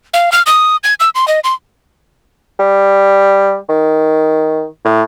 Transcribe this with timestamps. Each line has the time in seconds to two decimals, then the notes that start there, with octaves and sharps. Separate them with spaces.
0.14 F5
0.32 F6
0.46 D#6
0.84 G#6
1.00 E6
1.15 C6
1.28 D#5
1.44 C6
2.59 G3
3.69 D#3
4.85 A2